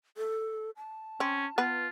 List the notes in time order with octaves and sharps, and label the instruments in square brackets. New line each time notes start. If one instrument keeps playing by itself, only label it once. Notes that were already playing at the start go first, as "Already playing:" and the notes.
[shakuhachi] A4
A5
[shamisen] C4 [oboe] C#4
[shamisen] B3 B4 [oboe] F4